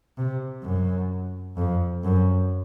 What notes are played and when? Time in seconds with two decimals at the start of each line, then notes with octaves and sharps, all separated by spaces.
0.18 C3
0.63 F#2
1.57 F2
2.04 F#2